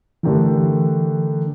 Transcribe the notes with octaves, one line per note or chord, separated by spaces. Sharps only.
D3 E3 A3 D4 G4 A#4